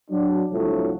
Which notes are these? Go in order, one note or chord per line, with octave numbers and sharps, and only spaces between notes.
F#3 D4
C2 A2 D3 F3 F#3